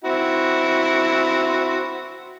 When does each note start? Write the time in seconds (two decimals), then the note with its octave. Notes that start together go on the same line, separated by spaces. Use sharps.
0.04 C4 E4 F#4